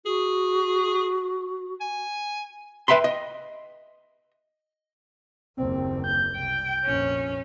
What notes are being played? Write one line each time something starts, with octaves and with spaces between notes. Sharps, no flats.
F#4 G#4
G#5
B4 E5 G5 B5 C6
D#5
F#1 D#2 C4
G6
C2 G5
A#1 F2 C#4